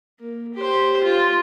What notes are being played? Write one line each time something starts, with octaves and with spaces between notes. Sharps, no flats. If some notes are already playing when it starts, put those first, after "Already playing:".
A#3
G4 C5
F4